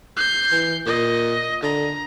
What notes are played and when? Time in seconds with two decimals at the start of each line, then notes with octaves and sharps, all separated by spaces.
0.17 G6 C7
0.52 E3
0.86 A#2 D#5
1.63 D3 A#5